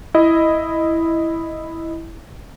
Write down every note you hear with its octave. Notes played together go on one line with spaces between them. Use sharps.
E4 D#5